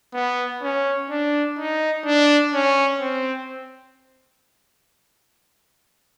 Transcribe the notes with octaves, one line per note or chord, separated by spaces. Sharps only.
B3
C#4
D4
D#4
D4
C#4
C4